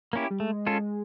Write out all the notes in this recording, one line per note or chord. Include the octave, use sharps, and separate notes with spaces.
A#3 C#4 E4 G4
G3
G#3 A3
C#4 F4 A4